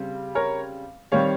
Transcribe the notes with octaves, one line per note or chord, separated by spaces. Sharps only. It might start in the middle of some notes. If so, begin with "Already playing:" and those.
Already playing: C#3 G3 C4
A#4 C#5
D#3 G3 C4 C#5 F5